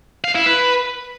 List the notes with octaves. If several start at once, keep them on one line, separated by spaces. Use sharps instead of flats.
F5
E4
B4